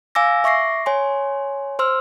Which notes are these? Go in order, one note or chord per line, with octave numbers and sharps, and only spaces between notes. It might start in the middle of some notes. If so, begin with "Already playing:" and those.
F5 G#5 D6 E6 A#6
E5 C#6 D6 A#6 C7
C#5 G#5 C6
C5 C6 E6 F6